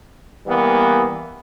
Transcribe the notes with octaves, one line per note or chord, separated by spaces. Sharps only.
E3 G3 A#3 B3